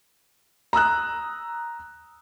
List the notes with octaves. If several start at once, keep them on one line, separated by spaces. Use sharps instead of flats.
A#5 D#6 E6 F#6